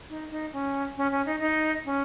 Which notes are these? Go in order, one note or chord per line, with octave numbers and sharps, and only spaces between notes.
D#4
D#4
C#4
C#4
C#4
D#4
D#4
C#4